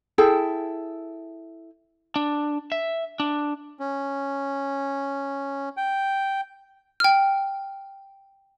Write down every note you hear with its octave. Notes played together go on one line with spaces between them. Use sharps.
E4 G#4 A4 G5
D4
E5
D4
C#4
G5
G5 F6